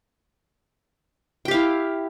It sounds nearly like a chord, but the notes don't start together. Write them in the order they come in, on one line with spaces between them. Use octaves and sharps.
G5 G4 F5 E4